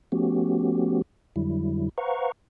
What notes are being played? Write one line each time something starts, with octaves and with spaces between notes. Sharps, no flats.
F3 A3 B3 C#4 F#4 G4
F2 D3 F#3 G3 E4
B4 C5 F5 F#5 A#5 C#6